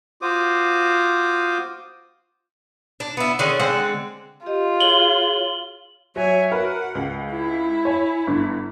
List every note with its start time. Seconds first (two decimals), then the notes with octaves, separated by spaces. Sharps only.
0.22 F4 F#4 C5 D6 D#6
3.00 D4
3.17 B3 E4
3.39 D3 D#3 C#4 G#4
3.59 D3 G#3 C4 F#5
4.46 F4 G4 D#5
4.80 F#4 G#4 C#5 F#7 G7
6.16 F#3 C#5 E5 G#5
6.51 F#4 A#4 B4 F#5
6.95 C#2
7.31 E4
7.85 C#5 G#5
8.27 G1 D3